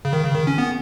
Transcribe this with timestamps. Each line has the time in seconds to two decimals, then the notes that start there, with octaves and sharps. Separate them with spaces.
0.05 C#3
0.13 D#3
0.24 C#3
0.35 D#3
0.47 C#4
0.58 B3